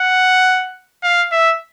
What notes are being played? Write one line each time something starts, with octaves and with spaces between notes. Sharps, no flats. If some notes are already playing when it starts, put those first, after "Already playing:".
Already playing: F#5
F5
E5